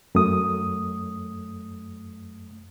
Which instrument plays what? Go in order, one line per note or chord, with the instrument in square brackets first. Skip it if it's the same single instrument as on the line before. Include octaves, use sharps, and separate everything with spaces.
[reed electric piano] F#2 A3 D#6